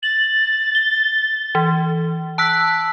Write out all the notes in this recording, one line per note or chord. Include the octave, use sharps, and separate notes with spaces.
A6 F#7
G7
E3
A5 E6 F#6 B6